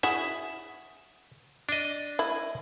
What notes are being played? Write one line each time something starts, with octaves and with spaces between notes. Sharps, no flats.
E4 F#4 G#4 E5
D4 D#5
E4